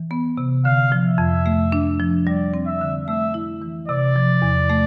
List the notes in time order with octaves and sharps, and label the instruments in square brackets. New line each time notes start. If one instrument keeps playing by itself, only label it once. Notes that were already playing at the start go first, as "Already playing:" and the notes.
Already playing: [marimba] E3
B3
C3
[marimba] D3 [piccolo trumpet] F5
[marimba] F3
[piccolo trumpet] E5
[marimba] F2
A3
D4
F3
[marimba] G3 [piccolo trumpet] D5
[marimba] C4
[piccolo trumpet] E5
[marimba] D3
[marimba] A3 [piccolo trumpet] E5
[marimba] E4
E3
[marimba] C3 [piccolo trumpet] D5
[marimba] F3
E2
A3